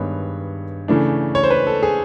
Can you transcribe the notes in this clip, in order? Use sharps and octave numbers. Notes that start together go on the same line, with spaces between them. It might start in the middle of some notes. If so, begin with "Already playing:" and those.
Already playing: G2 D#3 G#3 B3 C#5
C#3 E3 A3 D4
C#5
C5
B4
A4
G#4